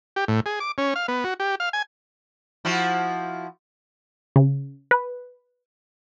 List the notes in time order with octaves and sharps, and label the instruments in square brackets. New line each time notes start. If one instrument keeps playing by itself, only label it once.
[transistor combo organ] G4
A2
G#4
D6
C#4
F5
B3
F#4
G4
F5
G#5
[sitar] F3 E4 F#4
[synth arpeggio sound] C#3
B4